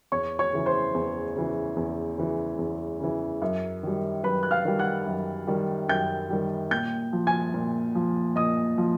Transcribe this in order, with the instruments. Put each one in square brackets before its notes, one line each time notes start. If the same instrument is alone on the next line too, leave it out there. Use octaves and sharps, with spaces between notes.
[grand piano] E2 C#5 C#6
C#5 C#6
C#3 E3
C5 C6
E2
C#3 E3
E2
C#3 E3
E2
C#3 E3
F#2
D#3 G3
F#2 B4 B5
F#6
F5 F6
D#3 G3
F#5 F#6
F#2
D#3 G3
F#2 G5 G6
D#3 G3
A#2 G5 G6
F3
G#5 G#6
A#2
F3
A#2 D#5 D#6
F3